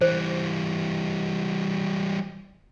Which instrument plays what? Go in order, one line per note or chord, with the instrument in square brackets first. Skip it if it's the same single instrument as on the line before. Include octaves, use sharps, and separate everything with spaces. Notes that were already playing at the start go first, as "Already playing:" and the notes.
[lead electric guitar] E3 G3 [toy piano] C5